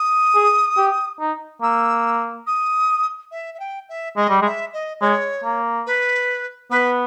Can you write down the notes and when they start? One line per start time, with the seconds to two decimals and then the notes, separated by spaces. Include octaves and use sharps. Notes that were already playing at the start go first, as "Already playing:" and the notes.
Already playing: D#6
0.35 G#4
0.77 G4
1.20 D#4
1.62 A#3 E6
2.47 D#6
3.31 E5
3.54 E5
3.60 G5
3.89 E5
4.17 G#3 D#5
4.29 G3
4.42 G#3
4.46 E5
4.73 D#5
5.01 G#3 C#5
5.44 A#3
5.86 B4
6.71 B3 B4